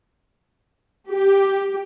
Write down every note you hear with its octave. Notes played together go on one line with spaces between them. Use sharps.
G4